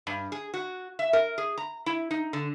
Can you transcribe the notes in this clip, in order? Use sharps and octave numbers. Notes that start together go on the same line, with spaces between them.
G2
G#4
F#4
E5
A#4
G#4
A#5
E4
D#4
D3